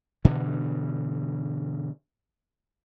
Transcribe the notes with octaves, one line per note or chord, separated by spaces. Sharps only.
G2 B2 D3 E3